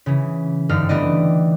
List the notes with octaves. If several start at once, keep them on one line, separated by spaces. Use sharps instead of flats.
C#3 E3
F#1 G2 D3 D#4 G4 F6
E3 G3 A3 B3 D5 D#5